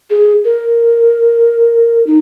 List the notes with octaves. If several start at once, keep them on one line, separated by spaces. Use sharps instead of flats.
G#4
A#4
D#4